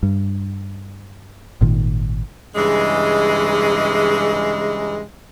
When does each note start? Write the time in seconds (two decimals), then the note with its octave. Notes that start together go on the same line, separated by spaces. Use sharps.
0.03 G2
1.61 G#1 A#2 D#3
2.55 G2 C#3 E3 G#3